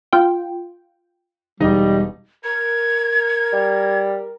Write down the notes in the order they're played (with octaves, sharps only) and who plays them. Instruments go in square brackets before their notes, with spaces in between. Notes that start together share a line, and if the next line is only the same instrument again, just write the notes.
[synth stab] F4 G5
[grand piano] E1 D#4 D#5 [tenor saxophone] G3
[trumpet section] A#4 [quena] G#6
[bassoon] G3